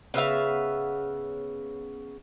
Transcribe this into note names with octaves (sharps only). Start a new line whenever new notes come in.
C#3 B3 E5 F5